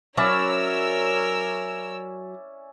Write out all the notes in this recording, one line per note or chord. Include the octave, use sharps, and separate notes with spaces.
F#3 C#4 E4 A#4 C#5 D5 E6